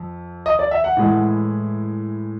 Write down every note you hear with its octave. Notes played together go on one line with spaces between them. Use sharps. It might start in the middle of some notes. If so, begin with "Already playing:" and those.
Already playing: F2
D#5
D5
E5
F#5
A2 E3 G#3